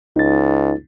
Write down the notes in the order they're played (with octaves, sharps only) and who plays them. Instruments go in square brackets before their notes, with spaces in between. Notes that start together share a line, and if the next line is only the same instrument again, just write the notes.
[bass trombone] C#2 [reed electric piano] D#4 A6